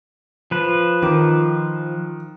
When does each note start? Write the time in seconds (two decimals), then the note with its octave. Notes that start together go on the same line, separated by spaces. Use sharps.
0.51 F3 B4
1.02 D#3 D6